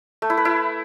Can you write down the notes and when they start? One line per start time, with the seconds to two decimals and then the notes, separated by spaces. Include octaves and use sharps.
0.22 A3
0.30 E4
0.37 B4
0.45 E4